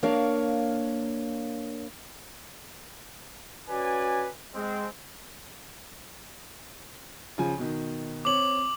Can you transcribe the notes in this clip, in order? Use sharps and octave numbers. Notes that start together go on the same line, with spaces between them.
A#3 D4 A#4 C#5 F5
C#4 F#4 B4 D5 G#5
G#3 C4
C#3 F3 G#5
B2 D#3
C4 C#5 D6 F#7